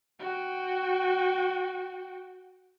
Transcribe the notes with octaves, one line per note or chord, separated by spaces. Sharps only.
F#4 G5